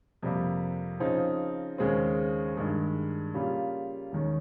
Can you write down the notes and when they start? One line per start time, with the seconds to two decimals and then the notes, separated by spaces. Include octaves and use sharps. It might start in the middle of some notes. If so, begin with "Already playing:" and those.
0.22 F2 C3 G3 A#3
1.00 C#3 F3 C4 D#4
1.78 D#2 C#3 G#3 C4
2.57 G2 D#3 G#3
3.34 C#3 G3 A#3 F4
4.12 D#2 D#3 G#3 C#4